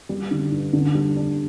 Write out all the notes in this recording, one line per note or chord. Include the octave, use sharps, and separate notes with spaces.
G3
D3
G2
D3
G3
D4